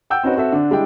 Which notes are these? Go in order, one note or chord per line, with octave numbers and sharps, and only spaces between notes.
F#5 G5 E6 G6
C4 C#4 D#4 F#4 B4
C4 F#4 A4 E5
D3 D4
G3 G#3 D4 E4 G5